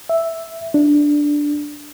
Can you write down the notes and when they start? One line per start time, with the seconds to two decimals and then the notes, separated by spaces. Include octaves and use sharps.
0.09 E5
0.74 D4